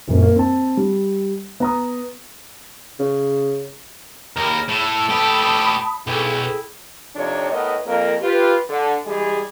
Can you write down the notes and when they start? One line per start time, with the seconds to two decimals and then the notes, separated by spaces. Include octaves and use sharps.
0.08 D#1 F#2 C#4
0.22 A#3
0.36 C4 A5
0.77 G3
1.60 B3 A#5 D#6
2.99 C#3
4.36 D#2 G#4 A#4 C#5 B5
4.69 A2 A4
5.09 A2 G4 A5 B5 D#6
6.07 B1 E4 G#4 A4 G5
7.15 F2 C3 F3 D4 D#4 C#5
7.52 A2 B3 A#4 D#5
7.87 F2 A#3 A#4
8.21 F4 G4 B4
8.69 D3
9.06 E3 G3 G#3 G4 G#4